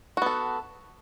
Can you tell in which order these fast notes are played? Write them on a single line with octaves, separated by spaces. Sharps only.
F#4 B3 A4